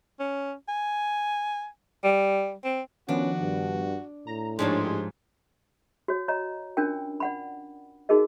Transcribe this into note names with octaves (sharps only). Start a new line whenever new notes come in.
C#4
G#5
G3
C4
D#3 F3 B3 C#4 D4 F#4
G2
A2 A#5
G#2 F3 G#3 D4 G4 C#5 A5 C6
F#4 C#5
C#5 D#5 A#5
C#4 D4 F4 A#4 G5
D5 F#5 B5
D#4 F#4 G#4 A#4 D#5